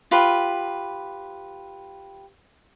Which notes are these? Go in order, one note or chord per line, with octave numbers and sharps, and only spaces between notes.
F4 G4 B4